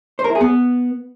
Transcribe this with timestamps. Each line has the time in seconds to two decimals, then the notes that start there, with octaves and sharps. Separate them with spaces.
0.19 C5
0.24 A#4
0.30 E4
0.35 G#4
0.41 B3